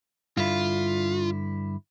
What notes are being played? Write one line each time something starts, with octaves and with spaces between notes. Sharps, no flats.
G2 D3 E4 F4